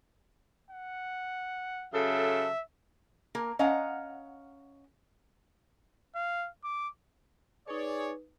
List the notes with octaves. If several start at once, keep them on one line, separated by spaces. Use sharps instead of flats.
F#5
C#3 F#3 A4 E5
A#3 A#4
C#4 D#5 F5 F#5 A#5
F5
D6
D#4 G#4 B4 C#5 D5